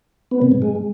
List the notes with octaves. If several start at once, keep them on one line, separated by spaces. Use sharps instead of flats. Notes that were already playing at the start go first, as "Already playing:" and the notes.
B3
C3
G#2
G#3